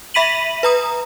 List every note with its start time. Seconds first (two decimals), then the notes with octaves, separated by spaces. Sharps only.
0.14 E5 B5 B6 D#7 F#7
0.63 B4 A#5 D#6